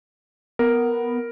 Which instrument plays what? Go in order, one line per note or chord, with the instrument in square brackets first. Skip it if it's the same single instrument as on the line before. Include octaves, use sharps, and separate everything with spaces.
[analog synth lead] B3 [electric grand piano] A#4